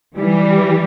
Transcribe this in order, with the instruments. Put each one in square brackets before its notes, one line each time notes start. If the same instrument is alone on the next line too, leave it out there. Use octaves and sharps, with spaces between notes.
[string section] E3 G3